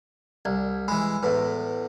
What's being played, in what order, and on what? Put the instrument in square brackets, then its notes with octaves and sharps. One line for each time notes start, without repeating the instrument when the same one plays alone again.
[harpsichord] C2 [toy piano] D5
[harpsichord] E3 G#3 [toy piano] B5
[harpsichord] E2 A2 [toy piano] B4